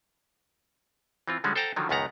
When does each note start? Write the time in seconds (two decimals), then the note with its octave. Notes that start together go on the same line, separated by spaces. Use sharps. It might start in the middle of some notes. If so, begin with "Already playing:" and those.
1.28 E3 C4 F4
1.44 D3 F3 G3 G#3 C#4
1.56 A4 C5 F#5 G5 A5 A#5
1.76 D3 D#3 F3 F#3
1.89 C#2 F#2 D#3 B3 F#5 A#5